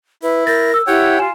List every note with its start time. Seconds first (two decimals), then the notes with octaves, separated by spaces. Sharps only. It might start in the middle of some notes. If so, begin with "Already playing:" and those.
0.23 E4 B4
0.47 A#4 G6 A6 A#6
0.74 E6
0.87 E4 G4 C#5 F#5 G5
1.19 F4 G#5 E7